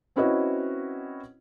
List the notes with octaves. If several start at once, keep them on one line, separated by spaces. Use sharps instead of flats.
C4 C#4 E4 F#4 B4 D#5